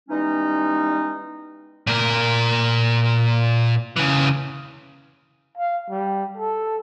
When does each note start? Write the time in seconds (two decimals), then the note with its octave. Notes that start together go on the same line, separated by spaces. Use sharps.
0.09 E3 G3 G#3 B3 C#4 D#4
1.87 A#2 A#4
3.96 C#3 E3
5.58 F5
5.90 G3
6.37 A4